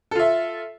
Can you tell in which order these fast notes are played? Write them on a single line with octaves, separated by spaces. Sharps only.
A4 F4 E5